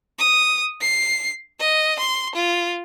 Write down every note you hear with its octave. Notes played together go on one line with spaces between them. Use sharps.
D#6
C7
D#5
C6
F4